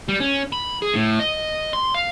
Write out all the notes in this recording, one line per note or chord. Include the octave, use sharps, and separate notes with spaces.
G3
C#4
B5
G#4
A2
D#5
C6
F5